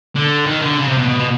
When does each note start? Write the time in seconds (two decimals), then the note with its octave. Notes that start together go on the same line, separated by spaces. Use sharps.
0.16 D3
0.46 D#3
0.62 D3
0.78 C#3
0.88 C3
0.98 B2
1.09 B2
1.19 B2